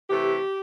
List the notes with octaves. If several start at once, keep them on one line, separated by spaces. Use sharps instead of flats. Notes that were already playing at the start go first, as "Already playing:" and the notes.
C3 E3 A3 G4